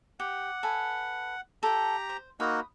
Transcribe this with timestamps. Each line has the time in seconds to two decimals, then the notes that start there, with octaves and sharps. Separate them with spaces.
0.20 G4 F#5
0.63 A4 B4 G#5
1.63 G4 A4 G5 A#5
2.09 C5
2.40 A#3 D#4 F#4 B5 D#6